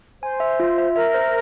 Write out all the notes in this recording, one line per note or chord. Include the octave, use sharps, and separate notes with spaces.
C5 G#5
E5
F4
E5
A#4 E5
C5